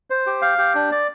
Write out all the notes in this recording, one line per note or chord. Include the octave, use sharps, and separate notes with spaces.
C5
G4
F5
G4
D4
D5